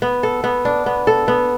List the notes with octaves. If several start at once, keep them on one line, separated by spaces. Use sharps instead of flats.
B3
A4
B3
D4
B3
A4
B3